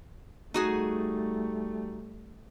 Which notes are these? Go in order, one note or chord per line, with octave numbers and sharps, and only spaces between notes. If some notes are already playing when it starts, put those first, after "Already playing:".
G3 A3 D#4 F#4 G#4